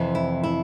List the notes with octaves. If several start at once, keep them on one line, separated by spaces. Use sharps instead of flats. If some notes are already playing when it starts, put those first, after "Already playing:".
Already playing: F2 C3 E3
E4
E4